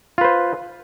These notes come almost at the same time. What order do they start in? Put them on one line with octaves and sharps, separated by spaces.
F4 B4 C5